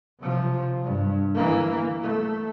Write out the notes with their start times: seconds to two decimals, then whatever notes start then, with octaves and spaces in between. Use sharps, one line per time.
0.19 C3 F3
0.84 G2
1.35 E3 A#3
2.02 A3